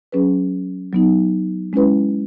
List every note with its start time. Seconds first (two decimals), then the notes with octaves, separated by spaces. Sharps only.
0.12 F#3 C#4 G#4 B4
0.93 F#3 B3 D#4
1.73 G#3 C#4 E4 B4